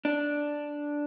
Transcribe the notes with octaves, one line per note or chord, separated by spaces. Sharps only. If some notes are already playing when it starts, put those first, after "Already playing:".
D4